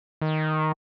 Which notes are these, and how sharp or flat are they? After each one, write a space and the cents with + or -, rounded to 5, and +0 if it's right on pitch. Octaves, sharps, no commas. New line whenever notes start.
D#3 +5